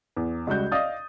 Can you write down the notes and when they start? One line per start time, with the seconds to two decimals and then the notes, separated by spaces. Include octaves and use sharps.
0.16 E2
0.47 C#2 G3 F#4 G6
0.72 D5 D#5 F5 D#6 A6